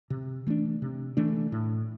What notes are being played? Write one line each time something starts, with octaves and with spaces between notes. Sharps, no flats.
C3
E3 A3 D4
C3
E3 A3 D4
A2